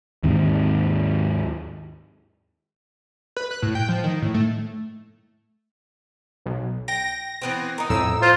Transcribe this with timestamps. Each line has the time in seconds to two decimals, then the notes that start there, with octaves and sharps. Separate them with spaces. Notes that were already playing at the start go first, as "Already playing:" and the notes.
0.23 D#2 G#2 D#3 C4
3.37 B4
3.51 F#6
3.62 A2
3.75 G5
3.89 F3
4.04 D#3
4.22 A2
4.34 A3
6.46 B1
6.88 G5 A#6
7.42 E3 B3 C4
7.78 D#4 A#4
7.90 F2 A2 E6
8.22 F4 C5